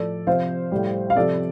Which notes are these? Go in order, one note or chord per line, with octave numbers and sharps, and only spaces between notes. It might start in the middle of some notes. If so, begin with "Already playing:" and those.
Already playing: A2 F3 A4 D5
C3 F3 C5 F5
A2 G3
F5
C3 F3 A4 D5